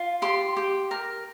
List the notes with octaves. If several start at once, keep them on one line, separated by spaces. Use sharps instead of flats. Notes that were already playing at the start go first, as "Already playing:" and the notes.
Already playing: F4
G4 C6
G4
A#4